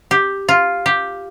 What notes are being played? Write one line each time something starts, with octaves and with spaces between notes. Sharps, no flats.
G4
F4
G4